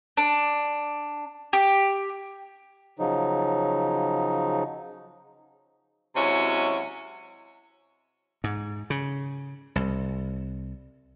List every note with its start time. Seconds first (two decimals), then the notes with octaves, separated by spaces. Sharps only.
0.17 D4
1.53 G4
2.99 C#3 F3 F#3 D#4
6.16 C3 F#3 G#3 C#4 E4 F#4
8.44 G#2
8.90 C#3
9.76 C2